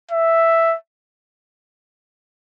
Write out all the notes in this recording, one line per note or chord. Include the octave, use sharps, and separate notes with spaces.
E5